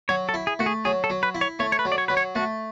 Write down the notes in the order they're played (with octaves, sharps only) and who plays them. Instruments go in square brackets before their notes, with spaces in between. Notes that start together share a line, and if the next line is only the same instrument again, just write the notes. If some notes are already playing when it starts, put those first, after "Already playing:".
[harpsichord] F#3 [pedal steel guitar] C#5
[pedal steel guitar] A4
[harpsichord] E4
[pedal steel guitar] G#4
[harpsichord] A3 [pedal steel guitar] F#4
[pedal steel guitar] G#4
[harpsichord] F#3 [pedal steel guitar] G#4
[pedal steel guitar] A4
[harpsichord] F#3
[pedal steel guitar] B4
[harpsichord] E4
[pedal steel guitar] C#5
[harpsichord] A3 [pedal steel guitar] C#5
[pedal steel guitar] C#5
B4
[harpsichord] F#3
[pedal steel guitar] D5
C#5
[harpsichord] F#3 [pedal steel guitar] B4
[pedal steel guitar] C#5
[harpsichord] A3 [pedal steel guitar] F#4